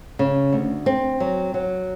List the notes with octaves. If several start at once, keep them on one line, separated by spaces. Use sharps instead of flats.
C#3
D2
C4
F#3
F#3